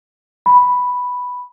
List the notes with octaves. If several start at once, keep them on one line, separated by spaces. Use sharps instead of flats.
B5